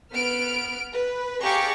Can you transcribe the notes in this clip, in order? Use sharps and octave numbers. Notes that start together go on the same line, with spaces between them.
B3 F6 D7
B4
G4 G#4 D5 F5 A#5 C#6